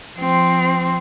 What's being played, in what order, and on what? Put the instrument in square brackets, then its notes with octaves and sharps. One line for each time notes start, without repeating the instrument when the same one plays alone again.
[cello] F3 C4